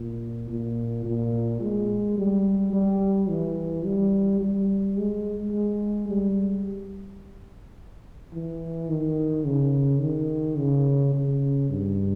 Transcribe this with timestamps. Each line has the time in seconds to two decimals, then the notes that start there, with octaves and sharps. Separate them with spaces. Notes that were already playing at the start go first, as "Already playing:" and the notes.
Already playing: A#2
0.49 A#2
1.05 A#2
1.61 G#3
2.18 G3
2.73 G3
3.30 E3
3.85 G3
4.41 G3
4.97 G#3
5.53 G#3
6.09 G3
8.33 E3
8.89 D#3
9.46 C#3
10.01 D#3
10.58 C#3
11.14 C#3
11.69 G2